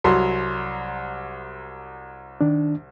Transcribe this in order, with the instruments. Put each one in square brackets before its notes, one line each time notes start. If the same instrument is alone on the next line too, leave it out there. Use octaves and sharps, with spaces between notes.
[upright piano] C2 F#3 C6
[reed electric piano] D#3 D4